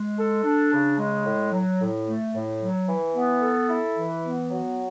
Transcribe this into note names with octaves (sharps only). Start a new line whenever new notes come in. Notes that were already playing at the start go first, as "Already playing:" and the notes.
Already playing: G#3
A4
D4
C#3
G#3
A2
F#3
A2
A3
A2
F#3
E3
B3
A4
E4
E3
B3
F#3